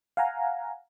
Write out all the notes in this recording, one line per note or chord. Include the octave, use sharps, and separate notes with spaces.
F5 F#5 G#5 A#5